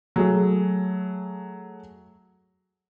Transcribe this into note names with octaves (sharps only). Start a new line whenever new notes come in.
F#3 A3 G#4